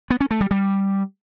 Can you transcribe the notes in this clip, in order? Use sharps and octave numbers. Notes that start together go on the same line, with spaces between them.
B3
C#4
A3
G3
G3